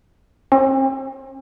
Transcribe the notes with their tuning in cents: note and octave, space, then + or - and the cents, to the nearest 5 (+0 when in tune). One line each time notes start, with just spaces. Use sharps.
C4 +45